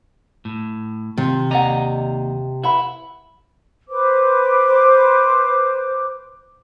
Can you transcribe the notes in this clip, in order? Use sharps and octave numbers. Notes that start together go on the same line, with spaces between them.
A2
C3 D#3 F4
D#2 G4 D5 D#5 F#5 A#5
E4 B4 F#5 B5
B4 C5 D6